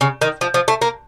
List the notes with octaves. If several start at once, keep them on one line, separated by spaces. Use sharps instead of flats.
C#3
D#3
F3
F3
A3
A#3